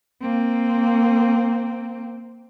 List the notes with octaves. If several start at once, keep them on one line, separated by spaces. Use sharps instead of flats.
A#3 C4